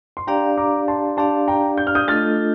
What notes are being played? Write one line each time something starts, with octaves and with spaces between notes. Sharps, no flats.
C6
D4 G4 D5 F5 G5 A#5
A#5 D6
A5 C6
D4 G4 D5 F5 A5 C6
G5 A#5
G6
F6
D#6 G6
A3 D4 F4 A4 D#5 F6 A6